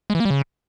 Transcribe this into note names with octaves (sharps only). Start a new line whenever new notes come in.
G#3
E3
A#3
G3
C#3